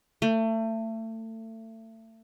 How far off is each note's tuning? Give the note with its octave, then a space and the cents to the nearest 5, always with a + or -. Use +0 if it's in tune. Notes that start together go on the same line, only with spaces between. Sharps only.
A3 +30